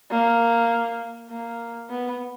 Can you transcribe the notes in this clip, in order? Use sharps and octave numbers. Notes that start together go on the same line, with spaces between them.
A#3
A#3
B3